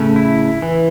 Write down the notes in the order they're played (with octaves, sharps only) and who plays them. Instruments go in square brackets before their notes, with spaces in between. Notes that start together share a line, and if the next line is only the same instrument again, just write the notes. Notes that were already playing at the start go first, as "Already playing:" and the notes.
Already playing: [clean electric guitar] A2 C#3 [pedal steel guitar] A3
[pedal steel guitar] E4
E3